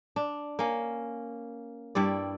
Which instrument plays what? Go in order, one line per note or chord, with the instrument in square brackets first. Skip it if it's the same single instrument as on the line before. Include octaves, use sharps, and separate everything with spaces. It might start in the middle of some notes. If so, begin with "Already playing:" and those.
[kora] D4
A#3 C#4
G2 G3 E4 D5